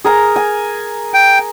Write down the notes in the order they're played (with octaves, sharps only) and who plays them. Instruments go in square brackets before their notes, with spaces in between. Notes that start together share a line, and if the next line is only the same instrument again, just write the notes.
[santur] G#4 A#4 A#5
G#5
[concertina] G5